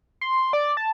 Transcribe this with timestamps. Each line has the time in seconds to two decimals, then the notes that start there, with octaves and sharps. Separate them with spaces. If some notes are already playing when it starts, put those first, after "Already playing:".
0.21 C6
0.53 D5
0.77 A5